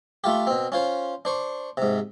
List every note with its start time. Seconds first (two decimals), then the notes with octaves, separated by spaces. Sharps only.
0.24 A3 F4 G4
0.47 B2 C4
0.72 C#4 F4 C5
1.25 D4 C5 C#6
1.77 G#2 C3